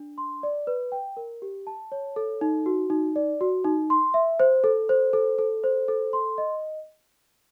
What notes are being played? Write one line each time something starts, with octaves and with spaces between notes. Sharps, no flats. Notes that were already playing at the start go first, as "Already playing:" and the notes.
Already playing: D4
C6
D5
B4
G5
A#4
G4
A5
C#5
A4
D#4
F#4
D#4
D5
F#4
D#4
C6
E5
C5
A4
C5
A4
A4
C5
A4
C6
D#5